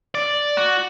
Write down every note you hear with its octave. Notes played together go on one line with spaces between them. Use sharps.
D5
F#4